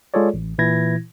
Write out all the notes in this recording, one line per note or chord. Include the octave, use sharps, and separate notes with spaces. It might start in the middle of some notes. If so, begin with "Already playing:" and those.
G#3 F4 G#4 A4 C#5 D5
A1
A#2 E3 E4 G#6 A#6